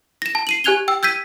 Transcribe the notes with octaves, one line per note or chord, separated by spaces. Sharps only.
A#6 E7
A5
C7 D#7 F#7
G4 G#5 F#6 G#6 F7 G7
G5 E6
E6 G6 G#6 B6 D#7